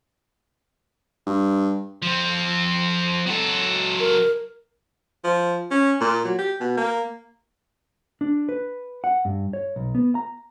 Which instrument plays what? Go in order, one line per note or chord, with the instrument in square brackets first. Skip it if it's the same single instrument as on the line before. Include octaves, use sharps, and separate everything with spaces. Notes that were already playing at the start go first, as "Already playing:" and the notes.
[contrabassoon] G2
[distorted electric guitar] F3 C4
F#3 A4
[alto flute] A#4
[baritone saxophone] F3
C#4
A#2
F#3
G4
B2
A#3
[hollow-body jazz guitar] D4
B4
F#5
G2
C#5
B1
B3
A#5